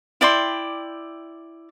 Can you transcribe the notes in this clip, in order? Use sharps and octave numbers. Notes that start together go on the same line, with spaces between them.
E4 D5 G5 C6